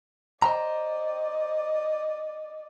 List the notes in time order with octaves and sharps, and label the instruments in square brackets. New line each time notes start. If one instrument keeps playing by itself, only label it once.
[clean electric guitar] C5 G5 A#5 [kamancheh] D5 D#5